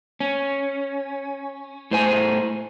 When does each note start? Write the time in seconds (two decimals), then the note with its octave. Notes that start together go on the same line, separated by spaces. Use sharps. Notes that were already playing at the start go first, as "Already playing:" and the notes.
0.20 C#4
1.91 A2 C5 G#5